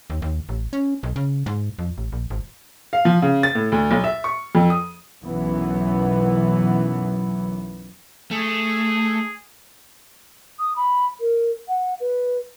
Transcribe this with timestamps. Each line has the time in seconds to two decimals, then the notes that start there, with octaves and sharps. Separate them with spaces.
0.10 D#2
0.22 D#2
0.49 A1
0.73 C#4
1.03 B1
1.16 C#3
1.46 G#2
1.79 F2
1.98 A1
2.12 A#1
2.30 G#1
2.93 F5
3.05 F3
3.22 C#3
3.43 A6
3.55 A2
3.72 D2
3.91 B1
4.04 E5
4.24 C#6
4.55 F2
4.70 D#6
5.22 B1 F#2 E3 B3
8.31 A3 G#4
10.59 D#6
10.76 B5
11.20 A#4
11.68 F#5
12.00 B4